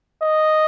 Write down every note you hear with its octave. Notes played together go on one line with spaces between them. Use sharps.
D#5